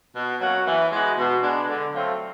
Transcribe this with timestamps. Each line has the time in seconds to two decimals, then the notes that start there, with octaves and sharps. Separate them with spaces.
0.15 B2
0.40 F#3 A#3 C#4 F#4
0.66 E3
0.91 G#3 B3 D#4 F#4
1.17 B2
1.42 G#3 B3 D4
1.68 D3
1.92 F#3 A3 C4 F4